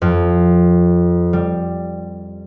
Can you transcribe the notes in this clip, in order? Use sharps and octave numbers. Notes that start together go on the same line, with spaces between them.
F2
G3